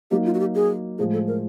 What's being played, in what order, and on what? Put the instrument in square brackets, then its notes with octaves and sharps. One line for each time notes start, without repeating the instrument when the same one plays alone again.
[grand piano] F#3 A#3 D#4 [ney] G4
[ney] F4
F#4
G4
G#4
[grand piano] A2 F3 G#3 [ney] G#4
[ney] A4
A#4